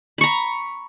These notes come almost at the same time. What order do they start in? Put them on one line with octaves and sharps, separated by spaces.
B5 C#6 A#5